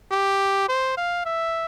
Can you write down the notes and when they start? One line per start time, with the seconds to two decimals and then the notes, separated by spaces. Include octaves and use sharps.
0.12 G4
0.69 C5
0.97 F5
1.25 E5